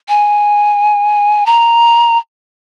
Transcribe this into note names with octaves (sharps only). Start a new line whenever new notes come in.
G#5
A#5